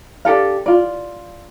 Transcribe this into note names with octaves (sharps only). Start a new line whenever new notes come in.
D4 G4 A4 F5
F4 D5